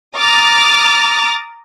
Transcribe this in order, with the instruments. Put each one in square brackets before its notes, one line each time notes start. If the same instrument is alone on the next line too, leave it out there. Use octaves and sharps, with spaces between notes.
[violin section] A#5 D6 D#6 F6 A6